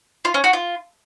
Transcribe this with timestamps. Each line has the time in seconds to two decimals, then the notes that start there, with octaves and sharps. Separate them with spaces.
0.25 F4
0.34 C#4
0.44 F#4
0.53 F4